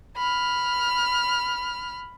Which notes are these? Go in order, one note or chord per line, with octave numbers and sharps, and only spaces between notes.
B5 F6